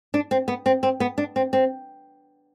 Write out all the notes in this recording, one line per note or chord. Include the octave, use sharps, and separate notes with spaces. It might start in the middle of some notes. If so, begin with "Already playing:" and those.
D4
C4
B3
C4
C4
B3
D4
C4
C4